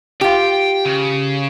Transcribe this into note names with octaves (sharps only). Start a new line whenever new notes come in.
F4 G4 G5
C#3